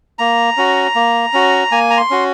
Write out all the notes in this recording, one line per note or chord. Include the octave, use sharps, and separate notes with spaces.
A#3 A#5
C#4 F#4
A#3
C#4 F#4
A#3 G#5
A#5
C6
C#4 F#4